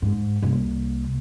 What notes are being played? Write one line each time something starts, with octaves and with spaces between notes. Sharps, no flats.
G#2
C2 A#3